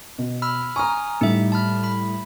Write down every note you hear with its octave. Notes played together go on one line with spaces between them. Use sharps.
B2
B5 E6 F6
G#5 A#5 C#6 D#6 F6
A2 G3 D#4 E5
A5 B5 F6
B5